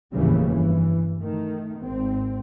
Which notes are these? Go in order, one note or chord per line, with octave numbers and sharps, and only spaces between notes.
F1 D#2 A2 C#3 E3 G3
G2 E3
D#3 A3
G#1 C4